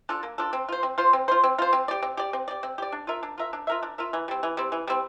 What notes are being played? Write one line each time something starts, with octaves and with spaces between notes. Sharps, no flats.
D4 F4 A4
A#3
D4 F4 A4
C4
F4 C5
C4
F4 C5
C4
F4 C5
C4
F4 C5
C4
G4 D5
C4
G4 D5
C4
G4 D5
C4
G4 D5
D4
F4 A#4 E5
D4
F4 A#4 E5
D4
F4 A#4 E5
D4
F4 A#4 E5
E3
G3 C4
E3
G3 C4
E3
G3 C4